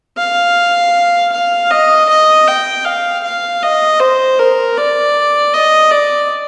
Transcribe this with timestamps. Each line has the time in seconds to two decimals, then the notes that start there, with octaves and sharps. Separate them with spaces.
0.18 F5
1.32 F5
1.71 D#5
2.09 D#5
2.47 G5
2.85 F5
3.23 F5
3.63 D#5
4.00 C5
4.39 A#4
4.77 D5
5.54 D#5
5.91 D5